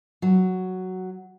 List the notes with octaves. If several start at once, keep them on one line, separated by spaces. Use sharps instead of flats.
F#3